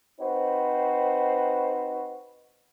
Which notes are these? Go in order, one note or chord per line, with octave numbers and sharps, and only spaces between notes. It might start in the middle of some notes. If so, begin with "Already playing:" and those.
C4 D#4 F#4 B4 C5